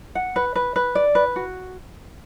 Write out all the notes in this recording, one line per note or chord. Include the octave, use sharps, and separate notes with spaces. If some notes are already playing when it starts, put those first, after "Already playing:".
F#5
B4
B4
B4
D5
B4
F#4